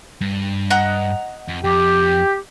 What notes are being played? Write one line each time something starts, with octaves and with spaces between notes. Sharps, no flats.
G2
D#5 F#5 A#5
F2
F2 G4